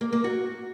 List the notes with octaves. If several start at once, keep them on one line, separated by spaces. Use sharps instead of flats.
A#3
A#3
F#4